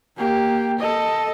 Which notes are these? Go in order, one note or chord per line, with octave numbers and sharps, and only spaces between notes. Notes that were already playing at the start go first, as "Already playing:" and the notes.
A#3 G4
A4 D#5